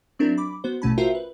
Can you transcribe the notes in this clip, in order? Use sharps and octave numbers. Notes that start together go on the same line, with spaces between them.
F#3 C4 D4 E4 A#4
B5 D6
B3 F#4 C5
A1 B2 A3 C#4 A5 B5
F4 F#4 A#4 C5 E5 G5
B4